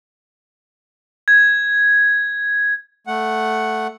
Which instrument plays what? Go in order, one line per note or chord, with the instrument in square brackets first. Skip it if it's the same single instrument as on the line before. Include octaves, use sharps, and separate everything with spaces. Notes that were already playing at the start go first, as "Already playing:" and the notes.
[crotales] G#6
[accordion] A3 F#5